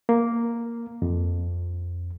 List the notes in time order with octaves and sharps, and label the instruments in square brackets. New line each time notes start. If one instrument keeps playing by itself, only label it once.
[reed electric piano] A#3
F2